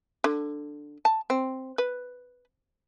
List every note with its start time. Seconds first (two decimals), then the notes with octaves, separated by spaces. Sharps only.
0.24 D3
1.05 A5
1.30 C4
1.78 B4